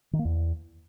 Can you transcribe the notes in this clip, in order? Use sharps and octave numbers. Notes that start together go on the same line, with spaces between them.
D#3
A#3
E2